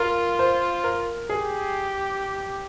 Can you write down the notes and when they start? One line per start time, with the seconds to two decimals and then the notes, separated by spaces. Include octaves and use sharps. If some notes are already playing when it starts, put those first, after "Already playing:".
Already playing: F4 A#4
0.39 C5
0.84 A#4
1.29 G4 G#4